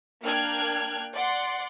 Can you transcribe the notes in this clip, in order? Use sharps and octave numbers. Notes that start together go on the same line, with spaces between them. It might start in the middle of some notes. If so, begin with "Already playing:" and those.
A#3 D4 G5 F6 F#6 G#6
D5 F#5 C6